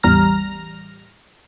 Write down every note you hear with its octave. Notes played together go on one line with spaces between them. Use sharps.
A1 E2 G3 A#5 F6 A#6